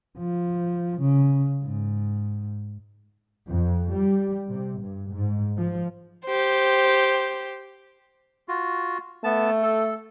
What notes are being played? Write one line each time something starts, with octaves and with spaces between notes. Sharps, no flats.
F3
C#3
G#2
F2
G3
C3
G2
G#2
F3
G4 C5
F4 F#4
A3 B3 A5
A4